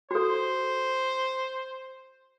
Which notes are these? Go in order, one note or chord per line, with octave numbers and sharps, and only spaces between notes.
F#4 A4 C5